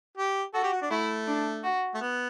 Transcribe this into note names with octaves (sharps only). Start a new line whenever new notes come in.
G4
F#4 A4
G4
F#4
D4
A3 E4
D4
F#4
A3
B3